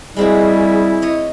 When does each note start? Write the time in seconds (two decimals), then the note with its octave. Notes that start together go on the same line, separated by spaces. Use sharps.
0.16 G3 G#3 C4 E4 F#4 G#4
1.02 C#5 D#5